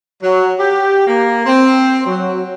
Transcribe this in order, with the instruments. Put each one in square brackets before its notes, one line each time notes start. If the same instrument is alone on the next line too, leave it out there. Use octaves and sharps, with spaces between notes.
[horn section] F#3
G4
A#3
C4
F#3